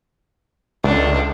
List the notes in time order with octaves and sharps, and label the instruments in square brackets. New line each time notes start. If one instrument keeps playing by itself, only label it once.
[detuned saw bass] C#2 [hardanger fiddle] A3 D4